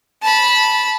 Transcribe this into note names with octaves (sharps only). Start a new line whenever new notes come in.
A5 B5